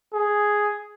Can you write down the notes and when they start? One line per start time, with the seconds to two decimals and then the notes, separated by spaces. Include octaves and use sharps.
0.14 G#4